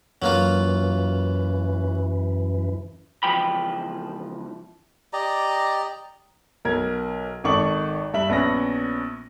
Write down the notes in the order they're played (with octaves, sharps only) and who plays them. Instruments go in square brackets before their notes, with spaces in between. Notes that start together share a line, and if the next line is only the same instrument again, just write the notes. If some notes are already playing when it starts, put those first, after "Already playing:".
[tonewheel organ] F#2 E3 [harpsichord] F#3 A#3 F4
[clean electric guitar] C#2 E3 F3 G5 B5
[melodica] G4 D5 D#5 A#5
[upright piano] B1 A#4 G#6
G#1 D#3 A4 C#6 D6 F#7
G2 E5 F#7
A#1 B3 C#4 A#6